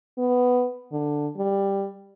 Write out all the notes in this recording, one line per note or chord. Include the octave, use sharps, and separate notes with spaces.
B3
D3
G3